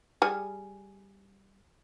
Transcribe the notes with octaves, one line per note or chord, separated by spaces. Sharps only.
G3 G#4